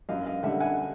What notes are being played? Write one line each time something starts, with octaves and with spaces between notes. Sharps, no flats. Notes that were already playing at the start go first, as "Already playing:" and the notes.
F#2 D#5 F5
D#5 F5
D3 G3 E5 F#5
F#5 G#5